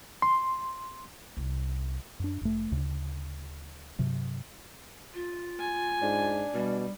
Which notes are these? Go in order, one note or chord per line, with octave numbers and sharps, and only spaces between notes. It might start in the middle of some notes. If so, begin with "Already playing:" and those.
C6
C2
F#2 D4
F1 A3
D2 C#3
G2 C3 F#3
F4
G#5
G#2 D4
B2 G3